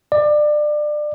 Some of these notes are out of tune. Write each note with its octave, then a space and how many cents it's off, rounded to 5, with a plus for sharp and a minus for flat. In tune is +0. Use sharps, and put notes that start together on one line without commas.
D5 +25